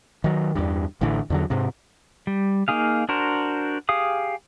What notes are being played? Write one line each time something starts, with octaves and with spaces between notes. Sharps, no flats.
D#3 F#3
E2 G2
A1 A2 D3 E3
E2 D3 F#3
G#2 C3
G3
A#3 D#4 G#4 F5
D4 F#4 A#4 C5
G4 G#4 F5 D#6